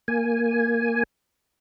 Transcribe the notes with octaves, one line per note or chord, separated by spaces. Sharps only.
A#3 G#5